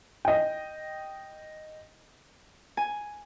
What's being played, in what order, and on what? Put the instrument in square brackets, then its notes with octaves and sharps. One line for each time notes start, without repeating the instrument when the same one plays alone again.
[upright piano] D#5 G5
[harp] G#5